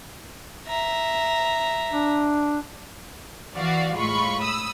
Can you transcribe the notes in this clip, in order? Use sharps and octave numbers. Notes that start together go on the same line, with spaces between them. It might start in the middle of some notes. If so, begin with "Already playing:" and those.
E5 A#5
D4
E3 F#4 D5 F5
A2 G#3 F4 B5 C#6
B5 D#6 E6